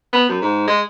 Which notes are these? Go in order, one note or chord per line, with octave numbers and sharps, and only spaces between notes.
B3
F#2
G#2
G#3